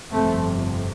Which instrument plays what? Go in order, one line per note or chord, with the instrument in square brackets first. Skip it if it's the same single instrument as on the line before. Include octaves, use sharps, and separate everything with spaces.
[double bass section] G1 F2 C3 A3 C4